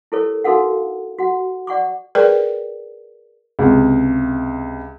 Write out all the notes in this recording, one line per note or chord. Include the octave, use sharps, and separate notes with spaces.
E4 G4 A4 A#4 C#5
D#4 F#4 A4 A#4 F5 F#5
F#4 F#5
D5 F#5 C#6 D6
G#4 A#4 B4 D5 G5
C#2 C3